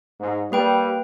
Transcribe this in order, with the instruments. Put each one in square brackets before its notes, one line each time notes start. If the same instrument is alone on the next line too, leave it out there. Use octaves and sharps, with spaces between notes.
[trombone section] G#2
[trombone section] G3 [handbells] A#3 B4 G5